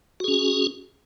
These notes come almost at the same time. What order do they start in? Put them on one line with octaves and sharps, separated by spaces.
F#4 G#4 C#4